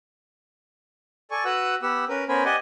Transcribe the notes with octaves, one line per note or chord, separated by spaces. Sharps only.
A4 D5 G#5 C#6
F#4 B4 F#5 E6 F#6
B3 G4 F#5 E6
C#4 A#4 B4
B3 C#4 A#4 C5 G#5 B5
G4 D5 D#5 F#5 G#5